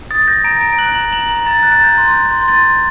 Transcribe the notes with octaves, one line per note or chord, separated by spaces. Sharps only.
D#6 A6
G6 A#6
A#5 D7
A#5 D7
F#6 F#7
A#5 F#7
A#5 F#7
A#5
A#5 A6
F#6 A6
A6
A#5 G6
C6 A6
G6
C6 G6
C6 A6
G6